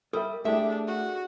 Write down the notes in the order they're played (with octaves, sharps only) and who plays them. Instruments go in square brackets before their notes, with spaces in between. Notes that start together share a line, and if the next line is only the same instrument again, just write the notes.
[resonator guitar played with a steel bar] G3 [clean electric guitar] A4 A#4 E5 [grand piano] D#6
[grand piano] A3 E4 G4 [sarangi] D4 [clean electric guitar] G#4 [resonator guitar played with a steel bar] E5
[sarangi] F#4